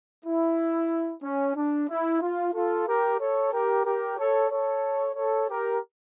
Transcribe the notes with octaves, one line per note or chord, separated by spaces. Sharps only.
E4
C#4
D4
E4
F4
F4 A4
G4 A#4
A4 C#5
G4 A#4
G4 A#4
A4 C#5
A4 C#5
A4 C#5
G4 A#4